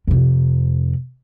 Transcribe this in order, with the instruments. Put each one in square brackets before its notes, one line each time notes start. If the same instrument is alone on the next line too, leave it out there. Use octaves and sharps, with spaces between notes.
[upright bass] F2 C3